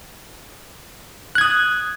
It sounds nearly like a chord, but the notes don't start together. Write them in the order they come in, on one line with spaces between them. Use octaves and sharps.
F#6 G#6 D#6